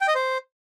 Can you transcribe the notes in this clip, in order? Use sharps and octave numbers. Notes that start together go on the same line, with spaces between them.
G5
D#5
C5